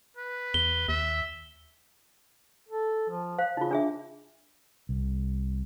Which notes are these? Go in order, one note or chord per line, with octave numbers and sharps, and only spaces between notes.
B4
E2 G7
D#2 E5
A4
F3
C5 F5
C#3 D#4 F4
D4 G#4 E5
C2